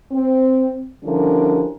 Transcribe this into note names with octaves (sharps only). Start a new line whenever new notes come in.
C4
D3 F3 G3 C#4 E4 A#4